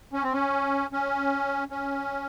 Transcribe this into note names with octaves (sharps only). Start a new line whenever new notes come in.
C#4
C4
C#4
C#4
C#4